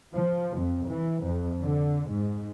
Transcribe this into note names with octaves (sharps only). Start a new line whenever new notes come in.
F3
F2
E3
F2
D3
G#2